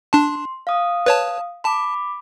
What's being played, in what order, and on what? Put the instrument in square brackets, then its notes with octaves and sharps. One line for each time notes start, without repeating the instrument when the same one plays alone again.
[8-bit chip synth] D4 A5 [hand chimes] C6
[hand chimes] F5 D#6
[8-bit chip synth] B4 C#5 A5
[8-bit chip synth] A5 [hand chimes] B5 D6